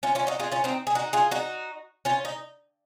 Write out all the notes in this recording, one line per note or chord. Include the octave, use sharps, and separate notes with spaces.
C#4 F4
C#4 F4
D#4 F#4
F4 G#4
C#4 F4
C4 D#4
G#4
D#4 F#4
F4 G#4
D#4 F#4
C#4 F4
D#4